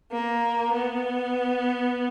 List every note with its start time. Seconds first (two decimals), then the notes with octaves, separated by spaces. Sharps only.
0.13 A#3
0.72 B3